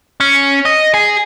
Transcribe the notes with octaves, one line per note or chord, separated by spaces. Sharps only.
C#4
D#5
G#4